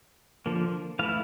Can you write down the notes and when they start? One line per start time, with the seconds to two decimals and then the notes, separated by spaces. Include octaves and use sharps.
0.46 D3 F3 A#3
0.99 E3 A3 E4 F5